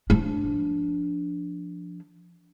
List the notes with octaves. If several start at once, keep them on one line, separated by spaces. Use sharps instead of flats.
F3 D4